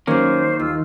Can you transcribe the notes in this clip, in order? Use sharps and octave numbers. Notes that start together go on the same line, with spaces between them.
D#3 F#3 A#3 C#4 C5
D#2 F4 E6 F6